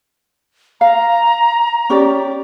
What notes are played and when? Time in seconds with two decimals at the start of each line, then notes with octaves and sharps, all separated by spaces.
0.81 F5 A#5
1.90 C#4 G4 D5